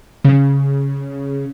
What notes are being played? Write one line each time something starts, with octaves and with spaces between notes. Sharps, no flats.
C#3